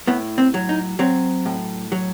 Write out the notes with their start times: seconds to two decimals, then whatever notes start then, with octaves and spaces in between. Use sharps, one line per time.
0.07 A2 B3
0.38 C4
0.54 F#3
0.69 D#4
0.99 F#3 C4
1.46 A2
1.92 F#3